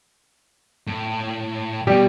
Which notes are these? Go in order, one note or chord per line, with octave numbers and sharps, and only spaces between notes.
A2
B2 G3 G4